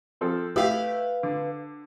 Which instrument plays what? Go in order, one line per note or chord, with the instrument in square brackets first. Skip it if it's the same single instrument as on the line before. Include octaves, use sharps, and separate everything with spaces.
[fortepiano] F3 C4 A4
[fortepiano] A3 E4 G4 [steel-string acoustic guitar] B4 F5
[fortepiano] D3